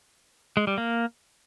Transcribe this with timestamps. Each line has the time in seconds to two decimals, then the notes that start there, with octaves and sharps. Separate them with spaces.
0.57 G#3
0.67 G3
0.78 A#3